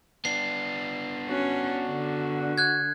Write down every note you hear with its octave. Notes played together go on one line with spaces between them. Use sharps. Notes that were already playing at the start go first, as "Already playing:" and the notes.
B3 D4 C7
C#4 F#4
D3
F#6 G#6